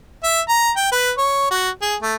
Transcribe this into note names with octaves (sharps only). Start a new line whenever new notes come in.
E5
A#5
G5
B4
C#5
F#4
G#4
A3